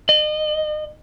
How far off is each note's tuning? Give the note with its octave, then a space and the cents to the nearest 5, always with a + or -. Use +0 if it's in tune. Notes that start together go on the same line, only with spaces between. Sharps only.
D#5 -35